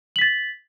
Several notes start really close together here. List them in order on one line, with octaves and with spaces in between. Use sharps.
F#7 B6 A6